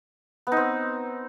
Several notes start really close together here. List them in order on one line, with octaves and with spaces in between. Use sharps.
B3 D#4 C4